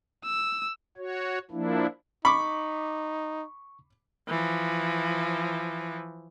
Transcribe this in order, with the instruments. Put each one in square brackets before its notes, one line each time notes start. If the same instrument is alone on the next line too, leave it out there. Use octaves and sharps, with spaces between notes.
[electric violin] E6
[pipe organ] F#4 C#5
F3 A#3 D4 E4
[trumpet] D#4 [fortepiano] B5 D6 [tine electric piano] C#6
[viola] E3 F3